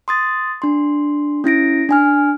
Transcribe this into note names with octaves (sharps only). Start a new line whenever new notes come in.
C6 D#6 A6
D4 C6
C#4 E4 A#6 D7
D4 G#5 F6